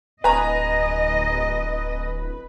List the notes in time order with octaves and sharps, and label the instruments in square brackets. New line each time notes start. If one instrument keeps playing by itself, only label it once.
[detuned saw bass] D1 [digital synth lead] B4 [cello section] D#5 [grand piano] G#5 A#5